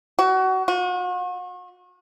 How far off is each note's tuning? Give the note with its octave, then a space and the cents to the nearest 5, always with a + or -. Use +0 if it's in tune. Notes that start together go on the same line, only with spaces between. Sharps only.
F#4 +25
F#4 -40